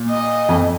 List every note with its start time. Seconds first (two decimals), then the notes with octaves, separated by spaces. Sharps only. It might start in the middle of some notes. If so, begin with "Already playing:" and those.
Already playing: A#2
0.10 D#5
0.49 F2